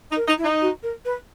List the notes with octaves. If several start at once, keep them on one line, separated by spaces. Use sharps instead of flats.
D#4
A#4
D#4
E4
D#4
F#4
A#4
B4